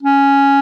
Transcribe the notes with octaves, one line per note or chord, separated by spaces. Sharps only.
C#4